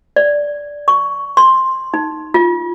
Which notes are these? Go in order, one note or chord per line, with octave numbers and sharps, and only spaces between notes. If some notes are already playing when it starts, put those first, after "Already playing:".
D5
C#6
C6
D#4
F4